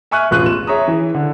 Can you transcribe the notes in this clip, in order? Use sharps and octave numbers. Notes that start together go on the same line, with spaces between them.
E5 G#5 C#6 F6 F#6 D#7
E1 A1 F4 C#6 F#6 D#7
E7
G#4 C#5 E5 A#5 D#6
E3
D3